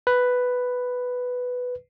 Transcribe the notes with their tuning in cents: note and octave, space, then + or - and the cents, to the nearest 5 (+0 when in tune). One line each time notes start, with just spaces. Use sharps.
B4 +5